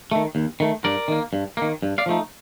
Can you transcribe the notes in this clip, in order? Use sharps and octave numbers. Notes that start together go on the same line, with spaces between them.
D#3 A3
D#2
D#3 A3
G2 A#4 D5
D#3 A#3
G2
D#3 A#3
G2
D5 F5
F3 A3 D#4